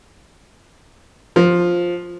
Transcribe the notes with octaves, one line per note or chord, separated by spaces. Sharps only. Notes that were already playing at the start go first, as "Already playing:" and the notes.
F3